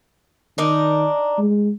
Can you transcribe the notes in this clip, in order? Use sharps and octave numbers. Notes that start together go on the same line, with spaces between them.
D#3 D4 D#4 A#4
G#3